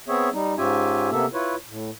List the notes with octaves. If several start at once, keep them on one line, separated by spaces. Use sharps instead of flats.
B3 C4 G#4 C#5 E5
G3 D#4
G#2 C#4 F4 G4 E5 G#5
C3 A#3 B3 A4 E5
E4 F4 B4 C#5
A2